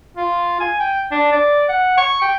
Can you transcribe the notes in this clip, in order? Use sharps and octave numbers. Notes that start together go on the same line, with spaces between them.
F4
G#5
G5
D4
D5
F#5
C#6
G5